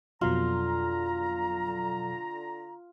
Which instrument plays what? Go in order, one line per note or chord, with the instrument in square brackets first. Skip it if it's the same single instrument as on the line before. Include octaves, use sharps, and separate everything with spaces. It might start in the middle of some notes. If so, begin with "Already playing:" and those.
[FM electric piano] F2 B2 F#3 [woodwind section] D3 A#5 [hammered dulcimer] F4